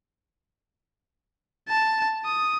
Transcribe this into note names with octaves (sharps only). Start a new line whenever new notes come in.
A5
D#6